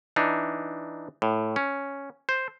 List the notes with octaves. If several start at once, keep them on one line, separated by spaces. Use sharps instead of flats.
E3 D4 D#4
A2
C#4
C5